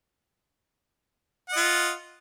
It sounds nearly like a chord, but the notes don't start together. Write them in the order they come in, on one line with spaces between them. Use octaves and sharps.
F#5 D#5 F4